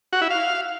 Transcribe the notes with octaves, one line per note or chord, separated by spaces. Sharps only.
F#4
E4
F5